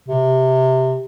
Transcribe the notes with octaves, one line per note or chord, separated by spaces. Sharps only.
C3